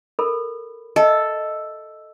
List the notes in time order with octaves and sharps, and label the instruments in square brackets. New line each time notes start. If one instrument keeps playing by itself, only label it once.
[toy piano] A4 A#4 B5
[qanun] A4 [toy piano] D#5 E5